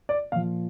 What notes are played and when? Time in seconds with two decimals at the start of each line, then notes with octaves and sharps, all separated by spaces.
0.09 D5
0.32 A#2 F3 F5